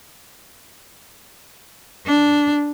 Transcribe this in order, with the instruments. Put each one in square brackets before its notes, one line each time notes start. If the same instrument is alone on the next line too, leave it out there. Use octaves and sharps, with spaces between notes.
[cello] D4